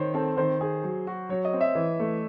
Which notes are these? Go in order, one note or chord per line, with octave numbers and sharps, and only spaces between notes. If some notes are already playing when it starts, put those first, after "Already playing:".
Already playing: D#3 C5 C#5
C4 A4
D#3 C5
G#4
F#3
F#4
F#3 C#5
D#5
C4
E5
E3
A3